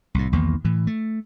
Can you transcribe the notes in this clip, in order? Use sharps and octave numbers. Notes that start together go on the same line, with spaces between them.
C2 A2
B1 E2 D#3 A#3
A2 E3
A3